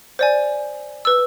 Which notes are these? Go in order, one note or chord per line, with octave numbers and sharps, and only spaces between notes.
C5 D5 G#5
B4 E6